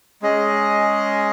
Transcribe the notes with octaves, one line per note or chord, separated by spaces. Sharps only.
G#3 C#4 G#4 D#5